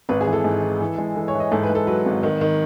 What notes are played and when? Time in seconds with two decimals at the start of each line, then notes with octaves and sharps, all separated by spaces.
0.09 G#1 B4
0.21 G#4
0.27 E3
0.33 A4
0.44 G#2
0.62 E3
0.81 E3
0.98 G#3
1.16 E3 A4
1.28 C#5
1.34 E3
1.40 D#5
1.51 G#2 A4
1.63 B4
1.70 G#2
1.75 A4
1.87 F#3 B4
2.05 G#1
2.23 D#3
2.41 D#3